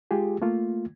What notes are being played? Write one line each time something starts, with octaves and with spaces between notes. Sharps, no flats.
G#3 F4 G4 G#4
A3 A#3 F4